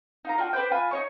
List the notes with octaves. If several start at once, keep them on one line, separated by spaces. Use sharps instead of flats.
D#4 F4 A#5
D4 F4 F#4 G5
D4 B4 C5 G5
F4 G#5 B5
D#4 C#5 C#6